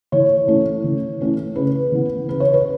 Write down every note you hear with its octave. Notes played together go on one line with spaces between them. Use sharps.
E3 C#5
A3 C#4 E4
E3
A3 C#4 E4
C#3 B4
E3 B3
C#3 B4
C#5
B4